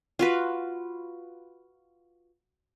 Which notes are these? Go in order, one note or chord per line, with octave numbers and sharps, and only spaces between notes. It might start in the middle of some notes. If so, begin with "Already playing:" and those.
F4 F#4 B4